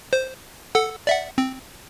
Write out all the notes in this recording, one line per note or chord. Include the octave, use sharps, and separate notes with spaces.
C5
A4 F#5 E6
D5 E5 F#5
C4